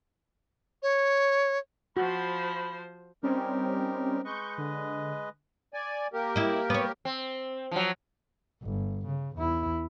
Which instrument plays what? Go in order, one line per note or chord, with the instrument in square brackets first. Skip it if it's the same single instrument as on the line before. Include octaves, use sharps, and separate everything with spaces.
[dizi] C#5
[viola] F3 C5 [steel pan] F#4 [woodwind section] B5
[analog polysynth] G3 C4 C#4 [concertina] D#4 G4 A#4
[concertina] G#3 B4 D#5 [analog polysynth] C#6 G6
[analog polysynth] D3
[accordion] D5 G#5
A#3 G4 A#4
[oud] E4 D#5
B3 C#5
[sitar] C4
F3 F#3
[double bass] G1
C#3
E2 E4